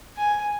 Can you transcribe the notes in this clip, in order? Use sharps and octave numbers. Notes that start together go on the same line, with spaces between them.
G#5